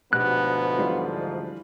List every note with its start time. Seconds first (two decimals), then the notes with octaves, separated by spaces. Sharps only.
0.13 D2 G#2 B2 F3 B3 G4 F#6
0.78 E3 G3 F4